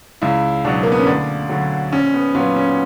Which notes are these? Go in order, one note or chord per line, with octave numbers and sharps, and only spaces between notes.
C#2 E4
B2 F#3 D4
A#3
B3
C#4
D2 D4
D3 F#3
A#1 C#4
B3
A#2 F#3 B3
C#4